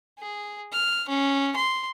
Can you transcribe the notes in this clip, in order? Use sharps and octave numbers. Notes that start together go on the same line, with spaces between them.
G#4
F6
C#4
C6